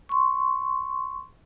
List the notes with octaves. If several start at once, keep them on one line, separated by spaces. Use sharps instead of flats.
C6 C#6